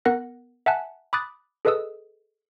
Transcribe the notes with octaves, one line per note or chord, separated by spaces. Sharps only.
B3 A#4 F#5 F#6 A#6
E5 F#5 G#5 A5 F#6
B5 D6 D#6 F#6 A6
G#4 A4 B4 D#5 D#6 E6